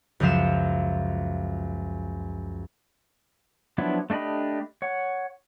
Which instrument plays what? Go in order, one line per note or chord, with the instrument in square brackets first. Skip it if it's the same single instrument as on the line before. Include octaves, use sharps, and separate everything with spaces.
[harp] C#2 F#2 F3 E5 F5 E7
[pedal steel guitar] F3 F#3 B3 D4 E4
A3 D4 G4 D#5 B5
C#5 F#5